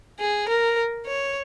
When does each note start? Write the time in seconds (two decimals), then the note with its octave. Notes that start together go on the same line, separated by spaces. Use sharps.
0.20 G#4
0.48 A#4
1.06 C#5